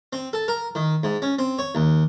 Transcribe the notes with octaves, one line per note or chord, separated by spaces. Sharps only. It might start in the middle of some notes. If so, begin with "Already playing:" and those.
C4
A4
A#4
D#3
G#2
C#4
C4
C#5
D#2